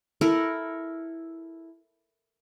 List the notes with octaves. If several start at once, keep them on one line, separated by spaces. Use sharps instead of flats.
E4 A4 A#4